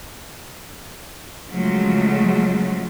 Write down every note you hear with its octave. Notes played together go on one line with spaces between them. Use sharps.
C#3 F3 F#3 G#3 A3